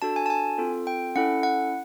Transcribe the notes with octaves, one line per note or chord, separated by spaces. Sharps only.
D4 F#4 A4 A5
G#5
A5
G#5
C4 F4 A4
G5
C#4 E4 A4 F#5
F#5